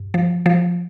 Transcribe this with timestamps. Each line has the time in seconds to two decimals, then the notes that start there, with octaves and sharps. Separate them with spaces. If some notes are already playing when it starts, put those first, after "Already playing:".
Already playing: G2
0.14 F3
0.46 F3